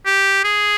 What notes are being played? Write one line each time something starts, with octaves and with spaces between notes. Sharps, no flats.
G4
G#4